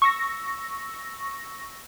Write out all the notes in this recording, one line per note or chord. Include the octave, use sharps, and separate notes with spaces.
C#6 E6 A#6